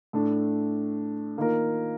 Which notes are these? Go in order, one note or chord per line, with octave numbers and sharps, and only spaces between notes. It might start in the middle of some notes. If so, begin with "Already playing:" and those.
A2 A3 D4
D#3 A#3 F4 A#4